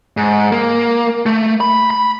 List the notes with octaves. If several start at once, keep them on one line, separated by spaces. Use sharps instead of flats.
G#2
A#3
A3
B5
B5